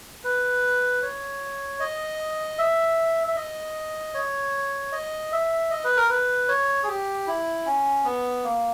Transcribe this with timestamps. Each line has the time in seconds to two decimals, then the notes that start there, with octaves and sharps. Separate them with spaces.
0.24 B4
1.02 C#5
1.80 D#5
2.58 E5
3.27 E5
3.36 D#5
4.14 C#5
4.92 D#5
5.32 E5
5.71 D#5
5.84 B4
5.97 A#4
6.10 B4
6.48 C#5
6.83 G#4
6.88 G4
7.27 E4
7.66 C#4
8.05 B3
8.44 A#3